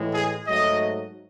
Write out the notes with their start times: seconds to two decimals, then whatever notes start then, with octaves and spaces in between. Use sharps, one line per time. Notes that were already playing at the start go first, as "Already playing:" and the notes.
Already playing: A2 E3 G#3
0.13 G#4
0.47 G#2 F#3 A3 D#5